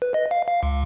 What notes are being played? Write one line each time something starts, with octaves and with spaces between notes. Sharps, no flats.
B4
D#5
F5
F5
C#2